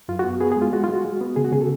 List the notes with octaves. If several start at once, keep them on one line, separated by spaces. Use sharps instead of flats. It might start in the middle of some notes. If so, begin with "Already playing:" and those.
F#2 F4
B3 F#4
B3 G#4
G#4
G#3
F4
G#3 F#4
F4
G#3 F#4
G#3
B3
C#3 G#4
F#4
C#3 G#4
A4